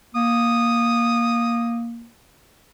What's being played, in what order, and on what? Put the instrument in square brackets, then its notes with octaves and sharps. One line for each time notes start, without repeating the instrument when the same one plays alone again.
[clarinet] A#3 [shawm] D#6